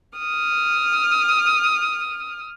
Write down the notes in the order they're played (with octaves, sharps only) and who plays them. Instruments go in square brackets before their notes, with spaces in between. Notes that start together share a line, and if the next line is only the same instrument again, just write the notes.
[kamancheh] D#6 F6